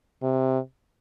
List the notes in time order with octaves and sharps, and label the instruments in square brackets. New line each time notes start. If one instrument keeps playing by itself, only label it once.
[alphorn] C3